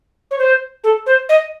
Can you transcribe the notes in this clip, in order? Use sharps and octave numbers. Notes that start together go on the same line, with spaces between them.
C#5
C5
A4
C5
D#5